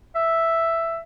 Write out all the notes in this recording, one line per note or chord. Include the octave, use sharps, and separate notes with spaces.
E5